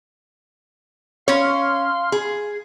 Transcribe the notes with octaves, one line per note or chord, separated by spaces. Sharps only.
C#4 C#5 F5 C6 F6
G#4